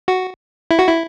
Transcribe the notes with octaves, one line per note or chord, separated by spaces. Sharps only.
F#4
E4
F#4
E4